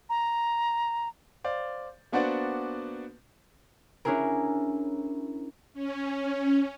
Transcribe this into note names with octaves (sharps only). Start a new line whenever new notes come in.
A#5
C5 D5 F5
A#3 B3 D4 F#4 C5 D5
C#4 D4 E4 G#4 A#4
C#4